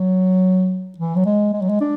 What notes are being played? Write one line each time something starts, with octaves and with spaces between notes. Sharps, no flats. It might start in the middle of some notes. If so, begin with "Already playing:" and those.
Already playing: F#3
E3
F#3
G#3
G#3
F#3
G#3
D4